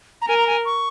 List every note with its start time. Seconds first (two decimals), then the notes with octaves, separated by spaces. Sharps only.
0.22 A#5
0.27 A#4 G#5
0.37 A#5
0.47 G#5
0.65 C#6